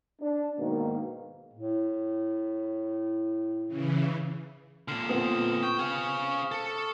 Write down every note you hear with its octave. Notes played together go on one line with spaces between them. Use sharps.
D4
G#2 B2 D#3 A#3
A2
C#3 E3
A#2 D3 F6 C7 E7
B3 C4 F4 D#6
G5 C#6
G#4 F5 F6
A4